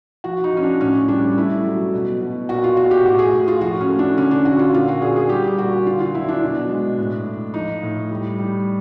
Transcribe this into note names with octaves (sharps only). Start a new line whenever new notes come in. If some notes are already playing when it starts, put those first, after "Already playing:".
F3 F#4
D#4
F3 C#4
D4
A2 C#4
G3 D4
A3 E4
F#3
B2
B2
A#2 F#4
F4
A#2 F#4
G4
A2 F#4
G#4
A2
F4
F3 F#4
C#4
A3
D4
D3 C#4
D4
D3 F#4
F4
A#2 F4
F#4
A#2 G#4
G#4
G3 G4
A#2 F#4
D3 F4
F4
F#3 E4
D4
B2
G#3
A2
A2
F3 D#4
A2
G3
G3